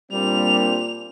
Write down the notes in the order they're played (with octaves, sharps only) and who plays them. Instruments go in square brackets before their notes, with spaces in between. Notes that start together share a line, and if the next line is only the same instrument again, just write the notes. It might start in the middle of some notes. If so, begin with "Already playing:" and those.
[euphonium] A#2 [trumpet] G3 [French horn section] A#3 C4 D4 [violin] F7